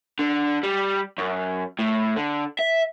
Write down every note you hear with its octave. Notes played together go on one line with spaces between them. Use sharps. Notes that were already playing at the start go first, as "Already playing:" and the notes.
D3
G3
F#2
A2
D3
E5